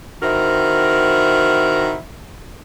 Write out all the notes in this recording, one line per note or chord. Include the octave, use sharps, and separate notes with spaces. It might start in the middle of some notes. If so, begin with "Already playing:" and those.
D#3 C4 E4 F#4 A#4